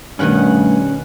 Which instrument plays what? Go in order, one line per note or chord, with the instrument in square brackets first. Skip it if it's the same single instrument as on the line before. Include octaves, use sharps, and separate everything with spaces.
[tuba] G2 [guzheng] B2 D#3 B4 [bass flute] A3 [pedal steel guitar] C#4 F#5